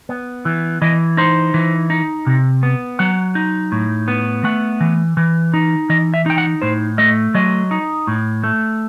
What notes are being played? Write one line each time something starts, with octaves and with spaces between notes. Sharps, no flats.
B3
E3
E3 D#5
D#4 C5
E3
D#4
C3
B3
F#3 F#5
D#4
A2
B3
A3 F#5
E3
E3
D#4
E3 D#5
E5
D#4 G5
F#5
A2 C5
A3 D#5
F#3 D#5
D#4
A2
A3